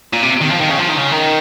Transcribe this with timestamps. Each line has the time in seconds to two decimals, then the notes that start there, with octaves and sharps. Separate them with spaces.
0.13 A#2
0.23 C3
0.41 D#3
0.50 F3
0.61 D#3
0.71 C#3
0.79 F3
0.90 D#3
0.98 C#3
1.12 D#3